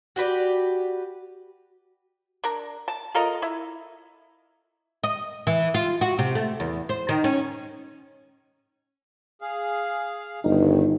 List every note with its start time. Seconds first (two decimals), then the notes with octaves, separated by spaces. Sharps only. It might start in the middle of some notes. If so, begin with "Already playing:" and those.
0.16 F#4 G4 B4 D5
2.44 D4 A#4
2.88 A5
3.14 F4 A4 A#4 D#5
3.42 E4
5.04 D#5
5.47 E3
5.74 F4
6.01 F#4
6.19 C3
6.35 A3
6.60 E2
6.89 C5
7.09 D#3
7.24 C#4
9.42 G#4 F5
10.44 G1 G2 D#3 D#4